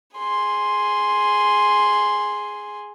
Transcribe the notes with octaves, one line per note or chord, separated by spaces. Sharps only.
G#4 C6